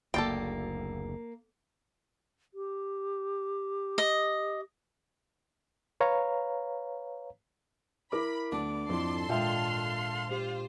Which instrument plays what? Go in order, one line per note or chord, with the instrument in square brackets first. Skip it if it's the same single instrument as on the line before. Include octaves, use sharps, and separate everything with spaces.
[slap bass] F#1 D2 [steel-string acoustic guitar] A#3 [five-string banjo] A4 D5 G5
[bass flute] G4
[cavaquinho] D#5
[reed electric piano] B4 C#5 F5 A#5
[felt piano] E4 A#4 D6 [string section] B5
[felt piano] D2 [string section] B3 [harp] D4 [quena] D6
[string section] G#1 A4 C6 [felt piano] F2 E4
[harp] A#2 G#3 [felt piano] F4 E5 G5 [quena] F5
[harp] F#6
[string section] F4 C5 [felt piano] G4